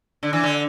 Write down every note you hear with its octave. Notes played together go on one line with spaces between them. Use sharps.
D3
E3
D3